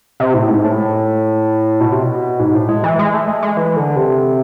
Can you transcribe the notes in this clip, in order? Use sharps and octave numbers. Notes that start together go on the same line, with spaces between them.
C3
A2
G#2
A2
B2
C3
B2
G#2
A2
G#3
E3
G#3
A3
G#3
G#3
E3
D3
C3